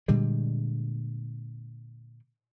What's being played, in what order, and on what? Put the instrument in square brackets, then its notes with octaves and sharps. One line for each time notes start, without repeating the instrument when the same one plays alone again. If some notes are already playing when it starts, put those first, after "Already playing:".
[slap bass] A#2 D3 G3 G#3